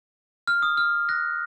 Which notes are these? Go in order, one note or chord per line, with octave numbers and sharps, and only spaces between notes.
F6
D#6
F6
F#6 A#6